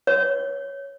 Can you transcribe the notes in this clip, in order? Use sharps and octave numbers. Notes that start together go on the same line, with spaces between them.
C#5